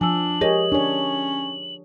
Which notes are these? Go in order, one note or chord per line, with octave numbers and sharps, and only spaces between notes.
F3 D4 G#5 E6 F#7
G4 G#4 A#4 C#5 D#5
C#4 D4 C#5